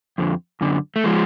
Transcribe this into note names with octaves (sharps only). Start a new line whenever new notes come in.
F2 D3
F#2 D3
A3
F3 G#3